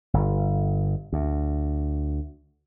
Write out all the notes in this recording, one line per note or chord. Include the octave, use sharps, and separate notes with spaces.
G1
D2